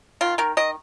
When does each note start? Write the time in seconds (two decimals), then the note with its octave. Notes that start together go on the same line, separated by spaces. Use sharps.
0.21 D#3 F4
0.38 D#3 A#4
0.57 D#3 D#5